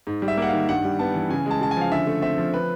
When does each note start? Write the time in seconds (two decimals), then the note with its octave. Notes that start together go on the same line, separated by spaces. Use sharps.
0.07 G#2
0.22 G3
0.28 E5
0.38 A#3 F#5
0.48 D#3 F5
0.69 G2 F#5
0.84 G3
0.99 B3 A5
1.14 E3
1.30 C#3 G#5
1.46 G#3 A5
1.61 C#3 A5
1.71 G#5
1.77 F3 F5
1.92 D3 E5
2.07 A3
2.22 C4 E5
2.38 F3
2.54 B4